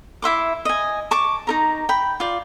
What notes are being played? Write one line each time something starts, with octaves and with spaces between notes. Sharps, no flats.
E4 E5 C6 D6
D#5 G#5
A5 C#6 D6
D#4 A#4 A#5
G5 B5
F4 D5